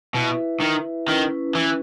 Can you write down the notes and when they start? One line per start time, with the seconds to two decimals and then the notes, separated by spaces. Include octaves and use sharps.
0.14 B2 E4 B4 E5
0.61 D#3
1.08 D#3 C#4 E4 B4
1.55 E3